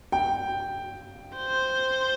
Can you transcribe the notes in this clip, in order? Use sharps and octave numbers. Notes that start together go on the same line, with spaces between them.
G5
C5